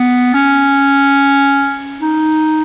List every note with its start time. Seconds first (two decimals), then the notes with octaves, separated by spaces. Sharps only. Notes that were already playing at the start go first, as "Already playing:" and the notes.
Already playing: B3
0.34 C#4
2.01 D#4